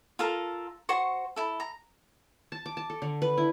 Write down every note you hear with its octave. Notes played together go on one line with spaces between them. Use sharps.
F4 A4 A#4
F#4 C5 C#6
E4 A4
A#5
A5
D6
A5
A4
D3
B4
E4